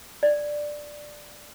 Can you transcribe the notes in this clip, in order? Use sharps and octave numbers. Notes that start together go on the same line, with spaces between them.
D5